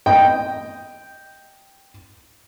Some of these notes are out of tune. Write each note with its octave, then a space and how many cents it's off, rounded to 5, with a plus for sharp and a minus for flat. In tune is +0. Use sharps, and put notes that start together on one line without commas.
D#5 +0 G5 +0